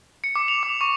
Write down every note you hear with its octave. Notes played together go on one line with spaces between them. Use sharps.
C#7
D6
F7
D6
C#6